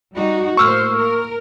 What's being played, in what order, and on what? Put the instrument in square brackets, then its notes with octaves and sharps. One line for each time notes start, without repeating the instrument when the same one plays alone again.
[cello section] G3 D#4 F#4
[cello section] A2 A#3 C5 [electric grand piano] C#6 E6 F6
[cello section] A#4